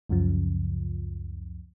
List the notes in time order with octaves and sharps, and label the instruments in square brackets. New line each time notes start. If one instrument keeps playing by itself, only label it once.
[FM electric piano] C#2 F#2 C#3 F3